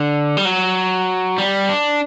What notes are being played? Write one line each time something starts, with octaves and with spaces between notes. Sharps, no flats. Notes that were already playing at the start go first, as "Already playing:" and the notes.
Already playing: D3
G3
F#3
G3
D4